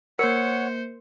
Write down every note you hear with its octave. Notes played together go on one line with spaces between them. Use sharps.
A#3 A#4 C5 C#5 F#5 C#7